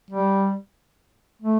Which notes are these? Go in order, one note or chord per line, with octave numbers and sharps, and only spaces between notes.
G3
A3